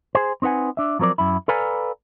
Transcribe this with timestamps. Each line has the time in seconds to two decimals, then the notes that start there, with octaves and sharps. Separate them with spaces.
0.15 G#4 C5
0.42 C4 D#4 B4 F#5 G#5
0.77 D4 E5
0.99 F3 F#3 C4 A#4 D5
1.18 F#2 E4
1.48 A4 B4 D5 F5 G#5 A#5